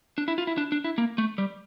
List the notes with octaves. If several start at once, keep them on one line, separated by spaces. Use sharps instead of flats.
D4
E4
F4
E4
D4
D4
E4
A#3
A3
G3